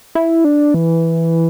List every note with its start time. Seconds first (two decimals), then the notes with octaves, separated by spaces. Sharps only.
0.15 E4
0.45 D4
0.74 E3